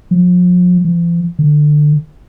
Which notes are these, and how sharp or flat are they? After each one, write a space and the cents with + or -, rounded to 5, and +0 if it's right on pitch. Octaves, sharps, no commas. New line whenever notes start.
F3 +40
F3 -45
D3 +20